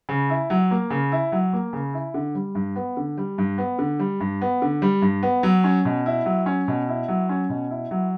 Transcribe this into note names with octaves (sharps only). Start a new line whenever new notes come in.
C#3
E4
F#3
A#3
C#3
E4
F#3
A#3
C#3
E4
D3
G3
G2
B3
D3
G3
G2
B3
D3
G3
G2
B3
D3
G3
G2
B3
F#3
C#4
B2
E4
F#3
C#4
B2
E4
F#3
C#4
B2
E4
F#3